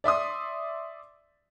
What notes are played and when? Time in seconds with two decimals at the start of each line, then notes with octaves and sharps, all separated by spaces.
0.04 D5 E5 C6 D#6